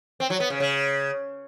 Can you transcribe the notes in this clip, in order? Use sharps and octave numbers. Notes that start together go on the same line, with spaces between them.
C4
F#3
B3
C#3
C#3